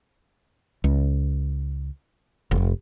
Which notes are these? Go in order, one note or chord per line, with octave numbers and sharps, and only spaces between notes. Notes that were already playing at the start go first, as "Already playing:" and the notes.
C#2
F1